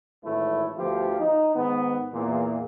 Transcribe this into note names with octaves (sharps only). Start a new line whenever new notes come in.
G#1 A2 E3 A3 E4
D2 F3 B3 F4 G4
D#4
G#2 D#3 B3
E2 A#2